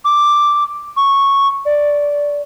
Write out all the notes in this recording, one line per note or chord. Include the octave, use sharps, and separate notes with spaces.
D6
C#6
D5